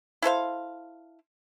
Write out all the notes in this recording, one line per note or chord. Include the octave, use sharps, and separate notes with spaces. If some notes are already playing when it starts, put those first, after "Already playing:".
E4 A4 C5 F5